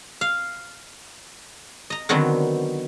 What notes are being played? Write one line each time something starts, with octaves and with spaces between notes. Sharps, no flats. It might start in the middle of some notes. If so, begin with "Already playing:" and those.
F5
D#5 A#5
D3 D#3 F#3 B3 C4